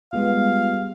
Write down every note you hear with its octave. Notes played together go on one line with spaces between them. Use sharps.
G3 G#3 B3 F4 F5